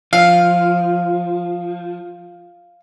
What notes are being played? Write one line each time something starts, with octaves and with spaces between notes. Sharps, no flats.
F3 F5